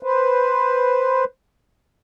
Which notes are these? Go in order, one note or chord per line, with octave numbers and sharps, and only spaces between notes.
B4 C5